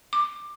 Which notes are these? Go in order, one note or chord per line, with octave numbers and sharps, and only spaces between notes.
D6